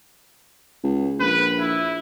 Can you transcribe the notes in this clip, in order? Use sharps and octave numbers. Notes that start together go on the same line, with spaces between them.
C#2
A#1 B4
E4